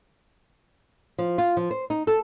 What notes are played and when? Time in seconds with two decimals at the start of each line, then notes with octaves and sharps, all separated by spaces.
1.18 F3
1.38 F4
1.57 F3
1.71 C5
1.90 D#4
2.07 A4